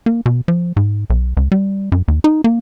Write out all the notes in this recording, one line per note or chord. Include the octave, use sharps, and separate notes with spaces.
A#3
B2
F3
G#2
B1
C#2
G3
F#2
D#2
D#4
A#3